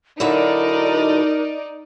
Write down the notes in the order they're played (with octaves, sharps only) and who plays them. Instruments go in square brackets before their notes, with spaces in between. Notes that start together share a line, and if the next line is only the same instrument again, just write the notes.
[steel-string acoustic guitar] D3 F#3 E4 [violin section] D#4 D5 [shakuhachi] A#4